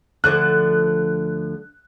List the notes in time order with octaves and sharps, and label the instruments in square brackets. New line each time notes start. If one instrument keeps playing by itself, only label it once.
[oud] D2 D3 F3 [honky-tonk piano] F#6